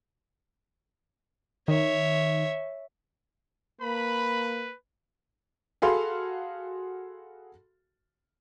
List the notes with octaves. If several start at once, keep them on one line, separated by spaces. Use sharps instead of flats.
D#3 C#5 E5
A#3 B4 B5
F#4 G#4 A4 F5 B5 C6